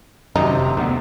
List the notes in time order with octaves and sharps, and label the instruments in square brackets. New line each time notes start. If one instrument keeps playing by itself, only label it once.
[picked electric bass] F#2 D#3 [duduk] C3 [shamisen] D#4
[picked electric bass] F1
D2 B3